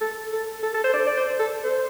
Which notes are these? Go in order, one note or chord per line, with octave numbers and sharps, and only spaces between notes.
A4
A4
A4
A4
C5
D5
D5
C5
A4
C5